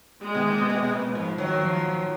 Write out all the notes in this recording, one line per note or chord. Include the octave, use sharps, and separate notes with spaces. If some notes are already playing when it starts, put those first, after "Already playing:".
G#3
B2 D#3
A#2
B2
B2
B2
A#2
G#2 F3
D#3 F#3
F3